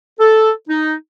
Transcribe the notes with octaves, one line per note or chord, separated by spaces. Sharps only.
A4
D#4